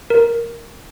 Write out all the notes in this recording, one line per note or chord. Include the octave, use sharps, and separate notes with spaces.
A#4